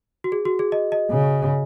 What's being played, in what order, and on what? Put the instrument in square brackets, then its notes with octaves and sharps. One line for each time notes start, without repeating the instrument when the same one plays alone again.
[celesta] F#4
G#4
F#4
G#4
D#5
D#5
[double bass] C#3